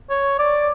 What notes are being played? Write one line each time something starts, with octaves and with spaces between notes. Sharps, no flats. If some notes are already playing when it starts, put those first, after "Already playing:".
C#5
D5